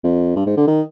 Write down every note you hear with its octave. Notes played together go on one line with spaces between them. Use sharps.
F2
G2
G#2
D3
D#3